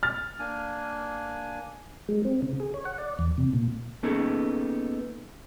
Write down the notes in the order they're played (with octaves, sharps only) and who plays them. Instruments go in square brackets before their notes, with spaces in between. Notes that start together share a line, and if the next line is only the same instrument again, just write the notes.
[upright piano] F6 A6
[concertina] A#3 D4 G#5
[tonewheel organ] G#3
C4
C#3
G#4
C#5
F#5
D5
E2
C3
A#2
[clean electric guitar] A#3 B3 C#4 D#4 G#4 A4